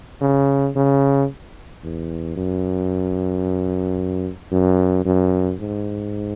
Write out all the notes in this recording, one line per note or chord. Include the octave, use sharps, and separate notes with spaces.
C#3
C#3
E2
F#2
F#2
F#2
G#2